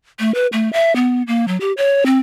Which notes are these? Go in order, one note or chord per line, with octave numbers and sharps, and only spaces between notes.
A3
B4
A3
E5
B3
A#3
F#3
G4
C#5
C4